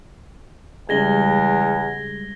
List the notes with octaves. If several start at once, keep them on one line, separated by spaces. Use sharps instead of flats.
E2 C#3 G3 G#3 G#6 A#6 G7